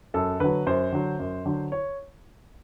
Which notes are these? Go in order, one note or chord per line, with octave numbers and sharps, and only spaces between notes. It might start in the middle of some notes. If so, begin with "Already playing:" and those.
F#2 A4
D3 F#3 B4
F#2 C5
D3 F#3
F#2
D3 F#3
C#5